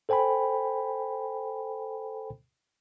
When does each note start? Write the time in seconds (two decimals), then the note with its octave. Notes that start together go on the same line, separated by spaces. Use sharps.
0.09 A4 C5 G5 G#5 B5